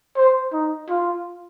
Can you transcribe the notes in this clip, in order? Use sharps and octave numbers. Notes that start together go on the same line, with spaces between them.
C5
D#4
F4